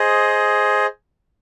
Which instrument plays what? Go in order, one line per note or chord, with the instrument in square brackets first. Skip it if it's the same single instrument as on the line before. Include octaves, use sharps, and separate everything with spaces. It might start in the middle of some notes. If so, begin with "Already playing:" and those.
Already playing: [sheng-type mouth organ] G#4 C5 D#5